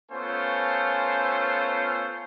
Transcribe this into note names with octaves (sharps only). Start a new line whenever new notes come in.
A3 B3 C#4 F4 C5 G#5